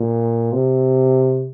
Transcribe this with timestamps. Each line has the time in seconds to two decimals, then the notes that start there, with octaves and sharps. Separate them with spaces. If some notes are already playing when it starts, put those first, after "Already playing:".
Already playing: A#2
0.53 C3